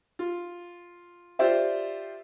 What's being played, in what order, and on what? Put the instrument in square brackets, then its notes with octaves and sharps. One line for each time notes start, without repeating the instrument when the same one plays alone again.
[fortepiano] F4
F4 G4 C5 D5 E5